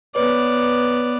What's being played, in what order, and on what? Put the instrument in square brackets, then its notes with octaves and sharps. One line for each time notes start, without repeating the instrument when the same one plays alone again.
[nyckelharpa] B3 D5 [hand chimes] B4 C#5